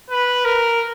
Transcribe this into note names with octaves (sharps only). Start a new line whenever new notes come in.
B4
A#4